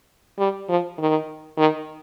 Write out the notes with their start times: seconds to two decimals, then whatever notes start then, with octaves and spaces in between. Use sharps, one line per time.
0.39 G3
0.69 F3
0.99 D#3
1.58 D#3